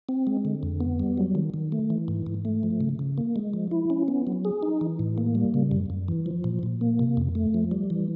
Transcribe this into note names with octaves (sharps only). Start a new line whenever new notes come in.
C4
G#3
D3
F2
B3
G3
F#3
D#3
D#3
A3
E3
G#2
G#2
A3
F3
C#3
C#3
A#3
G#3
F3
E4
C#4
B3
F#3
G#4
D#4
E3
A2
A#3
G3
C#3
F#2
F#2
E3
F3
A#2
A#2
A#3
C3
F2
A3
F3
G3
E3